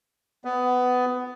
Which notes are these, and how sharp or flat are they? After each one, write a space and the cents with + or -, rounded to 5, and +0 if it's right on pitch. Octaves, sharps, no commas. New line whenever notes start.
B3 +15